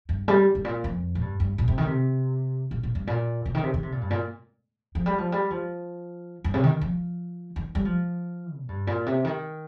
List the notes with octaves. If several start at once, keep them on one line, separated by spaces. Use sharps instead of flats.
G2
G3
G2
A#2
F2
A#2
G2
G2
A#2
C3
D#3
C3
A#2
A#2
G2
A#2
C3
D#3
C3
D#3
C3
A#2
G2
A#2
F3
G3
F3
G3
F3
G2
C3
D#3
F3
D#3
G3
F3
A#2
G2
A#2
C3
D#3